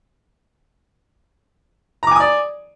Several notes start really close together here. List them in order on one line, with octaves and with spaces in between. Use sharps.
A#5 D6 G#5 D#6 D5